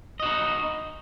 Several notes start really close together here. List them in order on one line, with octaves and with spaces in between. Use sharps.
D#5 F#4 D#4